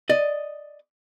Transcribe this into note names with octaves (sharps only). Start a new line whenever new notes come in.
D5 D#5